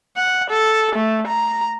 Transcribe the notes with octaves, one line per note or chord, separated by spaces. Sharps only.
F#5
A4
A3
A#5